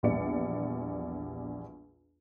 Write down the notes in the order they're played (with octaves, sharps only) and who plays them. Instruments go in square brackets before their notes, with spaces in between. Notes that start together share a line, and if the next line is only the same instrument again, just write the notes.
[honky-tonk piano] A#1 E2 G3 D5 C#7